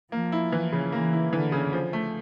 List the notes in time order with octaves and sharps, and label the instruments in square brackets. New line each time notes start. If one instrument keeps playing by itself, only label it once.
[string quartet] F3 [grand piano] A#3
[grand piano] E4
E3
C#3
[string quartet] E3 [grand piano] A#3
[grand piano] E4
[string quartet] D3 [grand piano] E3
[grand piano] C#3
F3
A3